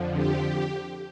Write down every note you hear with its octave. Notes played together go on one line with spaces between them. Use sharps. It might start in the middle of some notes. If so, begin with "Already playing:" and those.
Already playing: F2 D3 F3
G4